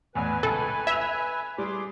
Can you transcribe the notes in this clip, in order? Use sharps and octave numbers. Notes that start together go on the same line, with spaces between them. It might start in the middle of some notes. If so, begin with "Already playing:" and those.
A1 E2 B4 G#5
C#2 A4
E5 G#6 F7
G3 G#4 C6 D6